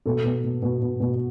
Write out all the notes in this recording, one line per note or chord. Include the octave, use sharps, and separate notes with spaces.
B2 A4
B2
B2
B2
B2
B2